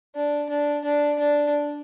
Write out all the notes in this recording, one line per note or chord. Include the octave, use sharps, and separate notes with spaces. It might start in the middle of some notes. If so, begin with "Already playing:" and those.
D4
D4
D4
D4